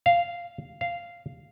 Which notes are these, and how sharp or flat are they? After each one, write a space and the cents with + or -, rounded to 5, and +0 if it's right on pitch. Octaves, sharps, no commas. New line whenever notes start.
F5 -10
F5 -10